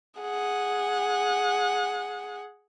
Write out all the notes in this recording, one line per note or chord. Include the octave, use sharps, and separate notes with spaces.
G#4 F#5